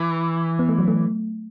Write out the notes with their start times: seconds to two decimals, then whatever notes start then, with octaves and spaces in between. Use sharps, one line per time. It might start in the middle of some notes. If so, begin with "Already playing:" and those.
Already playing: E3
0.59 B3
0.69 A3
0.79 F#3
0.88 A3